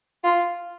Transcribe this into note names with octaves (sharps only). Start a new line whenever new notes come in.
F4